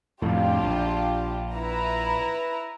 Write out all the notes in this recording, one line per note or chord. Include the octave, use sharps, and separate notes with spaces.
F2 A2 D4 F4 G4
A#1
E4 B4 A#5